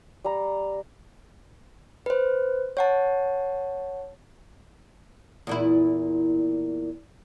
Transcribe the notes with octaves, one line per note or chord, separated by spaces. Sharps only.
G3 A#5
B4 C5
C#5 F#5 A5
E2 A#2 E4